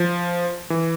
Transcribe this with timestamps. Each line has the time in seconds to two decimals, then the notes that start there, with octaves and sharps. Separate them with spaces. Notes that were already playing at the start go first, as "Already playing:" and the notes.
Already playing: F3
0.70 E3